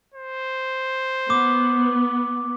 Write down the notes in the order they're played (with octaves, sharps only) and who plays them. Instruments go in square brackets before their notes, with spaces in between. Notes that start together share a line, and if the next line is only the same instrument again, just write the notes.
[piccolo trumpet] C5
[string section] B3 [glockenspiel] D6